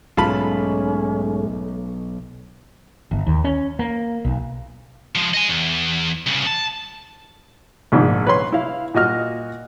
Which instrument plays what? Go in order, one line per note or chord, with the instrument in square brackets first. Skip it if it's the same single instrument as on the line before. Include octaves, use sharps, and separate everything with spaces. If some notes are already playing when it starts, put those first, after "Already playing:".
[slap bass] B1 [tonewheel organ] G#2 G#3 A3 [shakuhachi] C#4 [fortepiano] F4 A5 B5
[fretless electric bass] G1
D#2
C#4
A#3
B1
[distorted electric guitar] F3 G#3
D#5 G#5
E2
C2 C#3
A5
[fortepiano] A#1 G#2 D#3 D4
B4 C#5 C6
E4 F5
A#2 F#4 D#5 F6